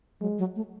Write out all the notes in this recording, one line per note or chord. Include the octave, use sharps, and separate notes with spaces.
F#3 G#3
F#3
A3